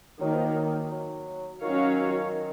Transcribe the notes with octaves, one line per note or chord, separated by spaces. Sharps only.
D#3 F#3 A#3 D#4
F3
F#3
F#3
D#3 F#3 C#4 F#4 C#5 F5